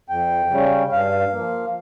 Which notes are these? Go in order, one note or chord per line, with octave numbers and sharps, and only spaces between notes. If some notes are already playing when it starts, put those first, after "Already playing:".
F2 G5
C#3 G3 C#4
G2 F5
F3 A#3